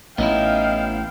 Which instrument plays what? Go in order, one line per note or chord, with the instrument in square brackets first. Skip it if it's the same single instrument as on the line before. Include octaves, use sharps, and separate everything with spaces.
[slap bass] A1 [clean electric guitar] B3 C#4 E4 [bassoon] D#4 [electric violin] F5 G5